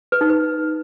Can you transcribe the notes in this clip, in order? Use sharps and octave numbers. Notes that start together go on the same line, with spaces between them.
B4
D#4
B4